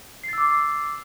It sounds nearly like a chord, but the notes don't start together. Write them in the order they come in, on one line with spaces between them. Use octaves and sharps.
C7 A6 E6 D6